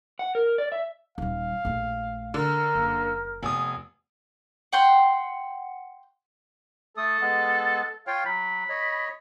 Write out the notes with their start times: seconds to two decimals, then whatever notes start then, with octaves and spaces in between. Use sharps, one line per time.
0.19 F#5
0.35 A#4
0.58 D5
0.72 E5
1.18 D#1 G3 F5
1.65 A#1 A3
2.34 D3 A#4
2.75 F#1 A#3
3.43 F1 B3 G#5 D#6
4.72 F#5 G5 C6
6.97 A3 A4 D#6
7.21 G#3 B3
8.07 F4 C#5 F5 G5
8.26 F#3 B5
8.69 C#5 D#5